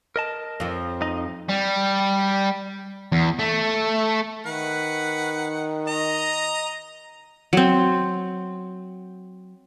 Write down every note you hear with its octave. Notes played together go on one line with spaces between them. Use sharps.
A#4 D#5 A5
F2 F3
D#4 D#5
G3
E2
A3
D#3 B4 F#5
D#5 A#5
F#3 C4